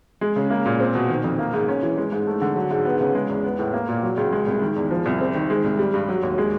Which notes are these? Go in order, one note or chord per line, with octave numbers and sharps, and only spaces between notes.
G#3
C#3
A#3
A#2
C4
B2
D#3
F2
A#3
G#2
C#4
E3
G#3
G#2
A3
D3
F#3
G#2
B3
C#3
G#3
E2
B3
A2
A#3
A#2
F#3
C#2
G#3
C2
D#3
E2
F3
C2
C4
D#3
G#3
C2
G3
G2
F#3
D#2
G#3